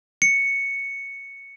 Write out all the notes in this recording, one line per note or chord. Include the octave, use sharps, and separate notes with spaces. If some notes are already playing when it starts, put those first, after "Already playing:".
C#7